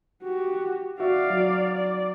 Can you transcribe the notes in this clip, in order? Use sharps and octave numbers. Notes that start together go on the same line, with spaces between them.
F#4 G4
F#4 D5 E5 F5
F#3
D5